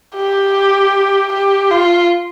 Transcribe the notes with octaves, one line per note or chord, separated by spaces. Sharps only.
G4
G4
F4